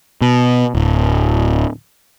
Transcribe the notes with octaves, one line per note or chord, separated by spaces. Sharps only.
B2
D1